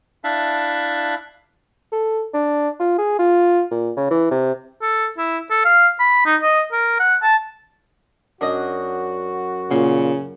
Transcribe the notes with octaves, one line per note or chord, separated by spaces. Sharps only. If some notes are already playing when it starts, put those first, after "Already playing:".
D4 E4 E5 F5 A5 F#6
A4
D4
F4
G#4
F4
A#2
C#3
E3
C3
A4
E4
A4
F5
B5
D#4
D#5
A#4
F#5
A5
F#2 D4 F#4 D#5
A#2 C#3 C6